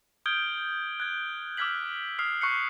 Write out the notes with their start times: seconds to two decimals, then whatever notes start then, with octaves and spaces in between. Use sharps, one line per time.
0.26 D#6 F6 G6 G#6 D7 G7
1.00 F#6 G#6
1.57 D6 E6 F6 G#6 B6 F#7
2.19 D#6 F6 C7 F7
2.41 C#6 F#6 C7 C#7